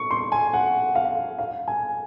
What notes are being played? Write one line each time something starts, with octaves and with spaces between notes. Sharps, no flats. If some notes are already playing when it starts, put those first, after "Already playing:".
Already playing: C#6
C6
G#5
F#5
F5
F5
G#5